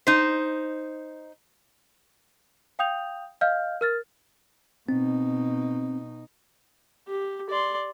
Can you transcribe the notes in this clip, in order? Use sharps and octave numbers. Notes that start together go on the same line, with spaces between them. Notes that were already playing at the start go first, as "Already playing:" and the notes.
D#4 C5
F5 G5 D#6 G6 F7
D#5 F5 F6 G6
A#4 F6 A6
B2 C4 D#4
G4
D5 C6